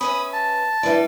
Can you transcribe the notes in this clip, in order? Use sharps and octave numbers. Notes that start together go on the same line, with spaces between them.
C#4 B4 E5 B5 D#6
A5
G3 D4 E4 B4 D5